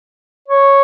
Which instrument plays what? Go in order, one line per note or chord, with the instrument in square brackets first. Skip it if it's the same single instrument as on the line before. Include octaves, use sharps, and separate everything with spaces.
[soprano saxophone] C#5